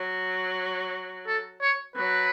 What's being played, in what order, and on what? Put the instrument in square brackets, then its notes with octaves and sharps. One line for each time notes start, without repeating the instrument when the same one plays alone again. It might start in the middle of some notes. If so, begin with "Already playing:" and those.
Already playing: [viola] F#3
[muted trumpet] A4
C#5
[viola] F#3 [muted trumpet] B4